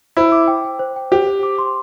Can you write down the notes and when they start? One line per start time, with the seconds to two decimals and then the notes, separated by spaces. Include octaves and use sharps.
0.17 E4 C5
0.32 D6
0.48 G5
0.64 G5
0.79 C5
0.96 G5
1.11 G4 C5
1.27 C5
1.43 D6
1.58 C6